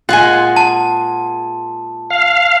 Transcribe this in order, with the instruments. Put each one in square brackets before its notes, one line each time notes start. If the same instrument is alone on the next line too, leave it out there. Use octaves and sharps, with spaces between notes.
[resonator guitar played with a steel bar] A#2 G#3 F4 [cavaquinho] F#5 G#5
[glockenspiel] A5
[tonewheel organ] F5